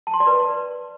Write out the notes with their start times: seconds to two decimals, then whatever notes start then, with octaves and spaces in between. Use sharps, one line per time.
0.07 A5
0.14 C6
0.20 D5
0.27 B4